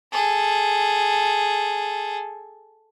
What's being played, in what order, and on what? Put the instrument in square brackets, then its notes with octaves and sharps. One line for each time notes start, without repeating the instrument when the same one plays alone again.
[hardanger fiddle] G#4 A4